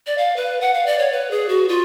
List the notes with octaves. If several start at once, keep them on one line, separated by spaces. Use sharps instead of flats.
D5
F5
B4
F#5
F5
D5
C#5
B4
G#4
F#4
F4